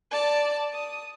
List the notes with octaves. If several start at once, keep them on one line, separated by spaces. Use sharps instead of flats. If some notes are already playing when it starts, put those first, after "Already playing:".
D5 A5
D#6